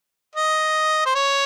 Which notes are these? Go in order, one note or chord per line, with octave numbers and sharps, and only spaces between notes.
D#5
C5
C#5